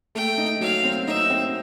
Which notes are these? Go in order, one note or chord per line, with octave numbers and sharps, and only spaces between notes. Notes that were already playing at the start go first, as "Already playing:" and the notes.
A3 G5
D#4
F#3 F5
C4
D#4 E5
C4